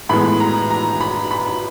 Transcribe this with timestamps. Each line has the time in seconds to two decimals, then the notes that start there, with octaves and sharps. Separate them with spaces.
0.09 A2 E3 G#3 B3 B5
0.40 A#5
0.70 A#5
1.01 B5
1.31 B5